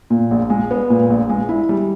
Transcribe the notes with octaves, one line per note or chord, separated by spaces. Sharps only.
A#2
A#1
G#3
B3
A#2
A#1
G#3
E4
G3